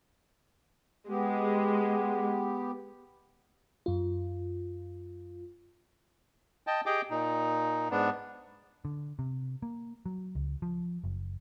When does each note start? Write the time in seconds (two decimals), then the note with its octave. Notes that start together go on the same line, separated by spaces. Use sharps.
1.08 G#3 B3 G4
3.86 F#2 F4
6.67 D#5 G5 A5
6.86 G4 G#4 D#5 G5 D6
7.10 A#2 D#4
7.91 G#2 B3 D4
8.85 D3
9.19 C3
9.62 A#3
10.06 F#3
10.35 C#2
10.62 F3
11.04 F#1